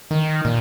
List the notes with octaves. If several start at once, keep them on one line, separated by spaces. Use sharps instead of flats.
D#3
A#2